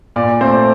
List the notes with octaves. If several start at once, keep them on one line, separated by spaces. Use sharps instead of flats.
A#2 D5
A3 C4 C5